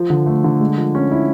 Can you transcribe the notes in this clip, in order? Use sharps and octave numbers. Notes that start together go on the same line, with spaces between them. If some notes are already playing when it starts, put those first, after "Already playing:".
Already playing: F3
D3
A3
D3
G#3
F3
C#4
E4